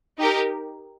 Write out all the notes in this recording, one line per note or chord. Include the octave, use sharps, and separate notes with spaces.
D#4 G4 A#4